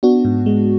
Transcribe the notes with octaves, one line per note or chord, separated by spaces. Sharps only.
B3 D4 F#4
G#2
G#3